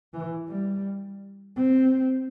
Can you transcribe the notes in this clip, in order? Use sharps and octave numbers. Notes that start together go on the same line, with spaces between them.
E3
G3
C4